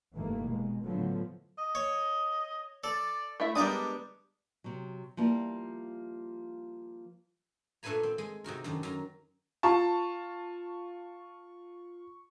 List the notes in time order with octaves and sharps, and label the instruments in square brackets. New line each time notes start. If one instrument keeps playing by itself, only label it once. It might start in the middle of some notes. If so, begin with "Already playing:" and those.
[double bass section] F1 G2 D#3 E3 A3 A#3
B2 G#3
A2 D3 F3 F#3 A3 B3
[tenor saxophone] D#5
[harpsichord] C#5
[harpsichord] A4 [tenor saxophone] D5
[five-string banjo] A3 E4 E5
[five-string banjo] G3 B3 D4 [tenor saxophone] G#3 [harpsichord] A#4 A#5 D#6
[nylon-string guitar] C3 F#3
F3 G3 A#3 E4
[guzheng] A#2 A3 D4 B4 G#5 A#5
C4
G#3
C3 D#4 F#4 A#4
F#2 D#3 D4
F#2 A#5
[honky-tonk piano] F4 A5 [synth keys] C#6